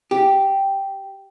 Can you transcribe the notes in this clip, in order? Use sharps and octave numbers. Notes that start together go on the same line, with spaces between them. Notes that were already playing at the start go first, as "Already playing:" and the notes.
G4